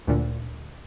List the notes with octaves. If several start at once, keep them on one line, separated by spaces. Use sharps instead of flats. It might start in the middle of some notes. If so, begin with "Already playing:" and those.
D2 A#2 D3